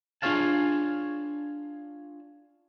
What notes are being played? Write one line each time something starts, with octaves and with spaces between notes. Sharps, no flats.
D4 F4 G#4 C#5 F5 A5